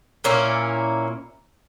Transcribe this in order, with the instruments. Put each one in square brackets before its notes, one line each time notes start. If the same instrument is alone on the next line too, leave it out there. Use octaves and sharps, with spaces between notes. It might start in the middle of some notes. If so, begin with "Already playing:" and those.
[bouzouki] A#2 A#3 C#4 E4